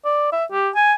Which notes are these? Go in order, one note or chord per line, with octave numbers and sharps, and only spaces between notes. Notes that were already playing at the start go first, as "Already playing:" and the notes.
D5
E5
G4
G#5